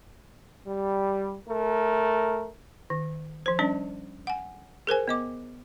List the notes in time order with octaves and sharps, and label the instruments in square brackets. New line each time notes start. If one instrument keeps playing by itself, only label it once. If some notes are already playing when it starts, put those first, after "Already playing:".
[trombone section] G3
A3 A#4
[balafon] D#3
F3 C5
G3 C#4 D4 D5
F#5 G#5
G#4 A#4 C5 G#5
B3 D#5 D6